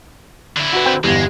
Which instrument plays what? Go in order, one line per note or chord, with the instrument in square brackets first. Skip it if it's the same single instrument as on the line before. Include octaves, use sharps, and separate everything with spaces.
[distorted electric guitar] D3 E4
[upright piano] F#4 B4
[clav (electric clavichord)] C4 G5
[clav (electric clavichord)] G1 E2 [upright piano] G3 [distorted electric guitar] G#3